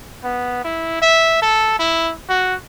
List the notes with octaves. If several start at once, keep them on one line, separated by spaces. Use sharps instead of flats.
B3
E4
E5
A4
E4
F#4